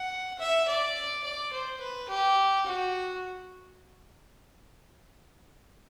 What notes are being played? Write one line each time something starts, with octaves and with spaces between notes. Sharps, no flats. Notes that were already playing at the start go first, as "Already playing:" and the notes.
Already playing: F#5
E5
D5
D5
C5
B4
G4
F#4